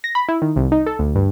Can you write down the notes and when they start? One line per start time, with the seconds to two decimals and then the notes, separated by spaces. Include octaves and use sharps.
0.04 A#6
0.15 B5
0.29 E4
0.42 D#3
0.56 C2
0.72 D#4
0.86 A4
0.99 D2
1.15 G2